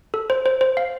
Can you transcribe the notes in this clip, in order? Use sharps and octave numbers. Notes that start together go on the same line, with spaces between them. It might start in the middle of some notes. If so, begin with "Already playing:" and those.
A4
C5
C5
C5
F5